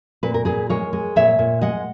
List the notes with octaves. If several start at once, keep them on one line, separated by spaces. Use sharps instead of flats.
A#2 B4
A#4
A#2 G#4 B4
G#3 A#4 C#5
G#3
A#2 C#5 E5
A#2
G#3 D#5 F#5